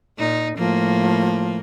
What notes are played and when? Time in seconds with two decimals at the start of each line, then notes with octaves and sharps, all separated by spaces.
0.18 A#2 D#4
0.57 A2 F3 A#3